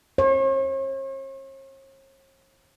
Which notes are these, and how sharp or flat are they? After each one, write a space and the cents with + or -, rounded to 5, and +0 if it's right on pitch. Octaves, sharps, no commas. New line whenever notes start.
C#5 -45